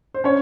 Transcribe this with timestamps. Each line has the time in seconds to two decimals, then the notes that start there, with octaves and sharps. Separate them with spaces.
0.14 C5
0.24 C#4 C#5